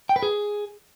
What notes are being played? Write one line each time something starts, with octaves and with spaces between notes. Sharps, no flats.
G5
B4
G#4